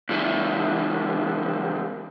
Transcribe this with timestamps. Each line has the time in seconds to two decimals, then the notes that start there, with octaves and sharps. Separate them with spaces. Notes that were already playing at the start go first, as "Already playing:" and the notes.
0.09 C#2 E3